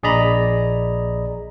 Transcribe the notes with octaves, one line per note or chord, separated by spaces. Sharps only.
A#1 G#4 D5 D#5 A#5 B5